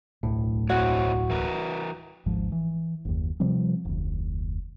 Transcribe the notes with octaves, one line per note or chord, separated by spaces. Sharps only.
D1 B1 A2 A3
C4 E4 F#4 C#5
E3 A#4 B4
D1 G#1 G#2 F3
E3
F#1 D#2
C3 F3 G3 C4
F1 D2